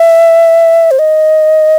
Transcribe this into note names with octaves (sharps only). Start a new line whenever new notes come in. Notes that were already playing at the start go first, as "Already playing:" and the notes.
Already playing: E5
C5
D#5